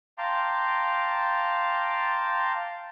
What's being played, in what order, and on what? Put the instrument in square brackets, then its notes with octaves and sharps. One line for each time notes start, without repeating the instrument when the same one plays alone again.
[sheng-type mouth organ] F5 G5 A5 A#5 C6 D6